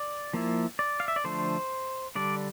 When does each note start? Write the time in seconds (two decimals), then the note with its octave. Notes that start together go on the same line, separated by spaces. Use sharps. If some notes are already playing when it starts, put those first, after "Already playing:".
Already playing: D5
0.33 F3 A#3 E4
0.79 D5
1.00 F5
1.08 E5
1.16 D5
1.24 D3 F3 A3 D4 C5
2.15 D3 G3 D4 D5